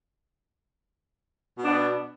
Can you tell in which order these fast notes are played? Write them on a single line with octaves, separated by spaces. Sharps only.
B2 D4 B3